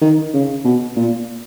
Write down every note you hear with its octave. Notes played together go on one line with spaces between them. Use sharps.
D#3
C#3
B2
A#2